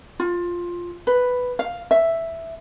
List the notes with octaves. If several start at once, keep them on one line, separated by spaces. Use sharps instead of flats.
F4
B4
F5
E5